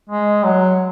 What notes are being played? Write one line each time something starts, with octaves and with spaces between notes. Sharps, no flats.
G#3
F#3